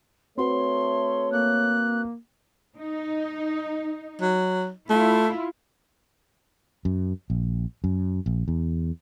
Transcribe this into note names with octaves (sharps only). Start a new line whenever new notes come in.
A3 C4 F#4 B4 C#5 C6
A#3 F#6
D#4
F#3
A3 E4 F4
F#2
A#1
F#2
A#1
E2